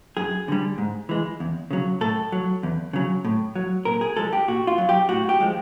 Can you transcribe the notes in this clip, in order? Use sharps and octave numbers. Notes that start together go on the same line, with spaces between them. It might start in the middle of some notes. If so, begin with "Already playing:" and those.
F#2 G#4
D3 G3
G#2
E3 G#3
E2
C#3 F#3
A2 A4
F#3
E2
C#3 F#3
A2
F#3
A#2 A#4
G#4
F3 G#3 A4
G4
A#2 F#4
F4
F#3
G4
A2 F#4
G4
F3 G#3